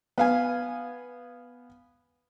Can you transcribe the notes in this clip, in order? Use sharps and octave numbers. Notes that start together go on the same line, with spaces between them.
B3 F5 G#5